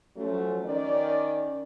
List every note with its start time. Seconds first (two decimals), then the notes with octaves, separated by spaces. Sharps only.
0.17 F3 F#3 A3 C#4
0.65 D#3 C#4 D5